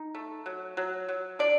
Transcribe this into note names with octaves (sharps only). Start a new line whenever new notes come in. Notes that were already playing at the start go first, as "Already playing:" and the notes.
Already playing: D#4
A3
F#3
F#3
F#3
D4 D5